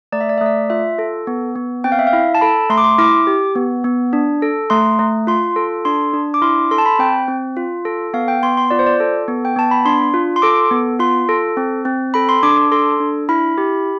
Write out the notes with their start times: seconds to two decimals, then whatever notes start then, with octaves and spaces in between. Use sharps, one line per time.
0.12 A3 D5
0.21 E5
0.29 D5
0.38 E5
0.41 A3 D5
0.70 F4 E5
0.99 A4
1.27 B3
1.56 B3
1.84 C4 G5
1.92 F5
1.99 E5
2.07 F5
2.13 E4
2.35 A5
2.41 A4 B5
2.70 A3 C6
2.78 D6
2.84 C6
2.99 E4 D6
3.27 G4
3.55 B3
3.84 B3
4.13 D4
4.42 A4
4.70 A3 C6
4.99 A3
5.27 F4 C6
5.56 A4
5.85 D4 C6
6.14 D4
6.34 D6
6.42 E4 C6
6.71 A4 C6
6.78 A5
6.86 B5
6.99 C4 G5
7.28 C4
7.57 F4
7.85 A4
8.14 B3 F5
8.28 G5
8.43 B3 C6
8.57 C6
8.70 F4 D5
8.79 C5
8.86 D5
9.00 A4
9.28 B3
9.45 G5
9.56 B3 A5
9.71 B5
9.85 D4 C6
10.14 F4
10.36 C6
10.42 A4 D6
10.71 B3
10.99 F4 C6
11.29 A4
11.57 C4
11.85 C4
12.14 A4 B5
12.29 C6
12.43 D4 D6
12.57 D6
12.72 A4 C6
13.00 D4
13.29 E4 B5
13.58 G4